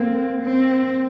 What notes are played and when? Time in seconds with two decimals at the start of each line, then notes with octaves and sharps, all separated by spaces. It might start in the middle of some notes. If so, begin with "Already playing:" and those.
Already playing: A#3 C4
0.42 C4